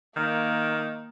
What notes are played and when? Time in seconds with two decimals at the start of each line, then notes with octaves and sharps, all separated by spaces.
0.17 D#3 A#3